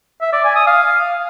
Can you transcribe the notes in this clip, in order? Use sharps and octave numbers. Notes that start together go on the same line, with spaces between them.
E5
D5
G#5
D#6
F5